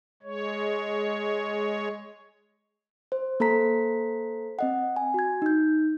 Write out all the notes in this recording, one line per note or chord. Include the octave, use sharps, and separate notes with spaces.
G#3 C#5
C5
A#3 A4 C5 A#5 B6
C4 D#5 F#5
G#5
F#4 G#6
D#4 G6